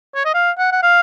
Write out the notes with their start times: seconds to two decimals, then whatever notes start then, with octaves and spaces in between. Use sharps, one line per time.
0.15 C#5
0.25 D#5
0.34 F5
0.58 F#5
0.72 F#5
0.83 F5